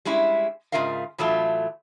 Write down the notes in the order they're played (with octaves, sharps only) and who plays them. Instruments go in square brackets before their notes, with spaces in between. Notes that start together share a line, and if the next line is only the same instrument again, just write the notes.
[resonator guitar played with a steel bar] G3 G#3 C#4 E4
G#2 C#3 F4 A#4 E5 F5
A2 E3 F#3 A3 E4 F4